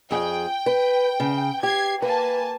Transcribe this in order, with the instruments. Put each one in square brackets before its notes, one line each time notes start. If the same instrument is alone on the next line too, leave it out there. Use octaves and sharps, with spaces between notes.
[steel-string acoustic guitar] F2 G#4 [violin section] G5
[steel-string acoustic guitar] B4
C#3
[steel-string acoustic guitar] G4 [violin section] G#6 C7
[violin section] A#3 G#5 A5 [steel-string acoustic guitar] B4